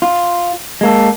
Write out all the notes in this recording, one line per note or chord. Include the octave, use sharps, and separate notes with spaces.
F4
G#3 A#3 A4